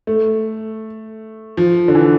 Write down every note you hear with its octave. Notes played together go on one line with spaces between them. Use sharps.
A3
F3
D3
E3